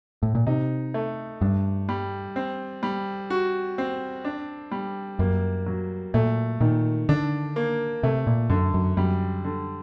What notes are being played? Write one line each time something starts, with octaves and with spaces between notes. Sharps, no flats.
A2
A#2
C3 D#4
A3
G2 D4
G3
C4
G3
F#4
C4
D4
G3
F#2 A#3
F#3
A#2 A3
A#2 D#3
D3 D4
A#3
C3 A3
A#2
F#2 D3
F#2
F#2 G3
D3